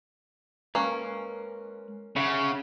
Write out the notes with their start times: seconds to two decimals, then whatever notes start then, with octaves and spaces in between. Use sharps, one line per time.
0.75 G#3 A#3 C#4 B4
2.16 C#3 C#5 E5 F#5